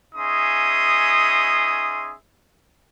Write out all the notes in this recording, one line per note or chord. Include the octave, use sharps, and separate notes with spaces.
C#4 D#4 G#4 E5 C6 D#6